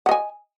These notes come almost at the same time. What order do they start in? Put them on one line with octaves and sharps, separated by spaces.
F#5 D#5 G#5